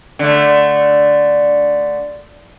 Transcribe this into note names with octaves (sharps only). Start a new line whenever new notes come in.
D3 A3